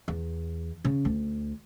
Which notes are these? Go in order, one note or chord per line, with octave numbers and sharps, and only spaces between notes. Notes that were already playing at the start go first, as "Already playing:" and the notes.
E2
C#3
D2